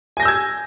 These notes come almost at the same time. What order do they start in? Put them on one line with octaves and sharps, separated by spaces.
G#5 A#6 G6 E6 G#6